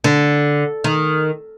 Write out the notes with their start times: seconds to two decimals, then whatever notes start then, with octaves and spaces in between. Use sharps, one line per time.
0.04 D3
0.84 D#3